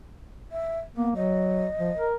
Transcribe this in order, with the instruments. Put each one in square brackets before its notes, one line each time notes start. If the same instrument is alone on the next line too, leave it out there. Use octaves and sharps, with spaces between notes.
[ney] E5
[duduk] A#3 [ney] B3
[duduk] F#3 [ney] D#5
[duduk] F3
A#4